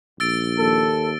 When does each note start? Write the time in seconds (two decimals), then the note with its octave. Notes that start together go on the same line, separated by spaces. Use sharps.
0.20 A#1 E6 A6 D7
0.59 D#2 A4